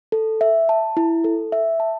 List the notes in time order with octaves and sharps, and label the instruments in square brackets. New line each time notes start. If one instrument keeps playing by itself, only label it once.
[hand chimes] A4
E5
A5
E4
A4
E5
A5